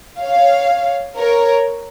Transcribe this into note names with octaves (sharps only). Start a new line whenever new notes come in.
C#5 F5
A#4 C#5